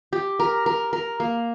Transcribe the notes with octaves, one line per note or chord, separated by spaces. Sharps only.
G4
A#4
A#4
A#4
A#3